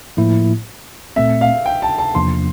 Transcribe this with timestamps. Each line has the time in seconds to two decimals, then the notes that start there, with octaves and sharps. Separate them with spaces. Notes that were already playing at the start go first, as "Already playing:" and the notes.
0.17 A2 F3 A#3 E4
1.16 A#2 A3 C4 E5
1.41 F5
1.66 G5
1.82 A5
1.98 A5
2.15 E2 C3 F3 A#3 D4 C6